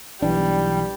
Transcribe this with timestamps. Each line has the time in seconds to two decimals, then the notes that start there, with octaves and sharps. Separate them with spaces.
0.22 B1 E3 G3 D4